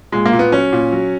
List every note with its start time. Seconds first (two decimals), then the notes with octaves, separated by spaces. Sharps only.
0.12 A#2 G#3
0.26 A#3
0.33 A#2
0.39 B3
0.52 F#3 C#4
0.72 A#2
0.92 F#3